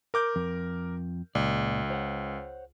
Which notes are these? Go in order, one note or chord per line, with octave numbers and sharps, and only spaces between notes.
A#4 D6 G6
F2
C#2 A#2 D5
C5 C#5 F#5